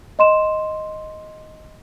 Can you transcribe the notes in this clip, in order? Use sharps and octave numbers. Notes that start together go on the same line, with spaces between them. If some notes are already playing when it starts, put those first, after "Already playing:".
D#5 C6 E7